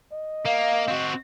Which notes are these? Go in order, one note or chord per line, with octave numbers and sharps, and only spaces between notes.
D#5
A#3 F5
C4 F#4